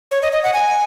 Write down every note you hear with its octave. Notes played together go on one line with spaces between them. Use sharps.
C#5
D#5
D#5
F#5
G#5